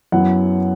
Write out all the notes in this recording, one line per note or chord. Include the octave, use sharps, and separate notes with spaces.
F#2 F#3 B3 E4 F#5